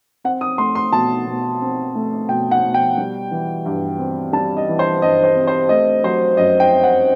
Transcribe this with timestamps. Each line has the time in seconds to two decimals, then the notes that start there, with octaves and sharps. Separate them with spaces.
0.24 C4 F#5
0.41 D#6
0.58 A3 C6
0.75 C6
0.92 B2 A5
1.27 B2
1.61 C4
1.95 A3
2.29 B2 G5
2.51 F#5
2.64 B2
2.74 G5
2.98 G3
3.31 E3
3.66 G2
3.99 C4
4.33 G3 A5
4.57 D#5
4.68 E3
4.79 C5
5.02 G2 D#5
5.24 C5
5.36 C4
5.47 C5
5.69 A3 D#5
6.04 F#3 C5
6.37 F#2 D#5
6.60 G5
6.72 C4
6.84 F#5